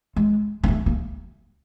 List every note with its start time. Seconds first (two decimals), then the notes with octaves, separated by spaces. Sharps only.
0.16 G#3
0.64 A#3
0.68 A3
0.86 A#3